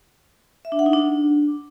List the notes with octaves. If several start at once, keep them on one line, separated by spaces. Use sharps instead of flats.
E5
D4
F#5
D#4
D4